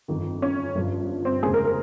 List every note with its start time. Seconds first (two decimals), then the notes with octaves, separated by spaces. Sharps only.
0.08 G1 F2 D#3
0.42 C#4
0.75 G1 G2 F3
1.25 C4
1.43 F1 D#2 C#3 G#3 C4 G#4
1.54 A#4
1.65 A#4